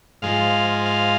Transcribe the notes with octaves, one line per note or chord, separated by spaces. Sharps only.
G#2 F3 G#3 F5
F5